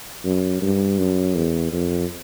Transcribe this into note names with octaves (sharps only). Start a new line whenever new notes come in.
F#2
G2
F#2
E2
F2